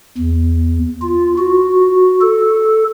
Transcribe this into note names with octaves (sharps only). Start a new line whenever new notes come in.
E2
F4
F#4
A4